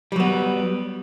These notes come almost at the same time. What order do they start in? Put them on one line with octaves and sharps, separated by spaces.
G3 F#3 B3